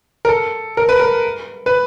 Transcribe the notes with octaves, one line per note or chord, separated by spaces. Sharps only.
A#4
A4
A#4
B4
A#4
B4